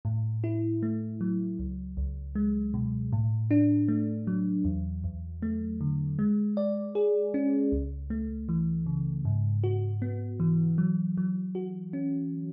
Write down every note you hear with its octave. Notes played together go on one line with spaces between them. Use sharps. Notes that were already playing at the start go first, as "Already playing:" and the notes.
A2
E4
A3
F#3
C#2
C#2
G#3
B2
A2
D4
A3
F#3
E2
E2
A3
D3
G#3
D5
G#4
C#4
C#2
A3
E3
C#3
G#2
F#4
B3
E3
F#3
F#3
F#4
C#4